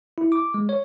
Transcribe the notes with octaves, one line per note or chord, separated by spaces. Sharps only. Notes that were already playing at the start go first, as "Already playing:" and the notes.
E4
D6
G#3
C#5